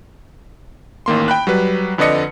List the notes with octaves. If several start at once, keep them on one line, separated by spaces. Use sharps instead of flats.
A1 D#3 A#3 C6
G5 B5 F#6
F#3 G3 B4
F2 D3 B4 D5 D#5 C#7